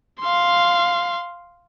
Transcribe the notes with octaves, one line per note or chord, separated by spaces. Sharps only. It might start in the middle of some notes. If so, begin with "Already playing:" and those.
F5 C6